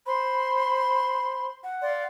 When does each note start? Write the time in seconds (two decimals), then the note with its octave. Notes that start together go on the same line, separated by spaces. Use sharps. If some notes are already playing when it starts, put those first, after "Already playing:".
0.06 C5 B5 C6
1.63 F#5
1.82 D5 F5 C6